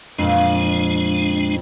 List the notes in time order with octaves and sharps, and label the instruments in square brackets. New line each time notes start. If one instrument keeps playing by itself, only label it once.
[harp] F2 A#2 [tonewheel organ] G#3 D4